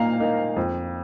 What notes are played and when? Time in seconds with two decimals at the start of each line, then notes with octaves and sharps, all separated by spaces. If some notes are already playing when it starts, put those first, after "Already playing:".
Already playing: A#2 A#3 D#4 F5 A#5
0.20 A#3 D#4
0.56 F2